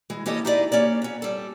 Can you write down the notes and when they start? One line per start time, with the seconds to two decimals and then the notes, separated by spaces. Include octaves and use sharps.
0.10 E3 G#3
0.26 E3 A#3 C#4 G4 A4 D#5
0.45 D#4 E4 G4 G#4 D5 D#5
0.72 A#3 C#4 C#5 D5
1.02 B3 C#4
1.22 G3 A4